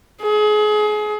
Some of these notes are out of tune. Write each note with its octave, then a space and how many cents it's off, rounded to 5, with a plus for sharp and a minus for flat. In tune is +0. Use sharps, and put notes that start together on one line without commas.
G#4 +30